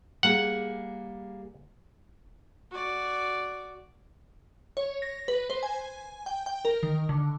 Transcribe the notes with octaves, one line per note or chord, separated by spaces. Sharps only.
G3 A#3 G#4 F#5
F#4 D5
C#5
A#6
B4
C5
G#5
G5
G5
A#4
D#3
D3